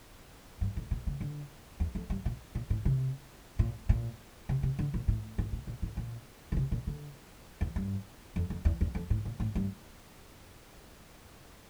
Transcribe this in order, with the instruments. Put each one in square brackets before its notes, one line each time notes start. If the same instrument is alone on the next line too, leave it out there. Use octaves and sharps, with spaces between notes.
[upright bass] G2
A2
A#2
D3
D3
E2
F2
G2
A#2
A#2
A2
C3
A#2
A#2
C3
C3
D3
A#2
A2
A2
A#2
A#2
A2
A#2
D3
C3
A#2
D3
E2
G2
F2
F2
E2
E2
F2
A2
A#2
A2
G2